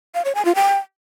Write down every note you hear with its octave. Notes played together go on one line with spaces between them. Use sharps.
F5
C#5
G#5
F4
G5